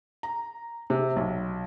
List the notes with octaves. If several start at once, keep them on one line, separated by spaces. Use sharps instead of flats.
A#5
C3
B1